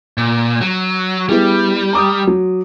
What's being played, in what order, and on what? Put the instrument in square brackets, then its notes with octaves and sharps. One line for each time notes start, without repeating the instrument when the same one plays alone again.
[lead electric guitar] A#2
F#3
[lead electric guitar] G3 [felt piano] B3 E4 G#4
[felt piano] A#5 D6 D#6
F#3